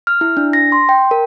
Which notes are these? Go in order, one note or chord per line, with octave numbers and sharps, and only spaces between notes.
F6
E4
D4
A#6
C6
G5
A#4